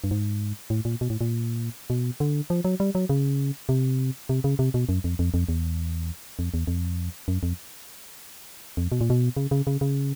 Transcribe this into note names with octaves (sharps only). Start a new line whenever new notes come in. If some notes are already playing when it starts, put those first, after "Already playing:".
G2
G#2
A2
A#2
B2
A2
A#2
B2
D3
F3
F#3
G3
F#3
C#3
C3
C3
C#3
C3
B2
F#2
F2
F2
F2
E2
F2
E2
F2
F#2
F2
F2
B2
A#2
B2
C#3
C#3
C#3
C#3